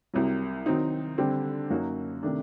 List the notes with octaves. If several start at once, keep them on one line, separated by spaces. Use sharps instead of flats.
C2 C3 F#3
D#3 F#3 C4 D#4
D3 G3 C4 G4
F#2 F#3 A#3 D#4 F#4
C3 D#3 A3 D4